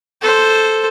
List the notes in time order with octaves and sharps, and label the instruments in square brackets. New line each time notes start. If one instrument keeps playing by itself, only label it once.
[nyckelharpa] A4 C5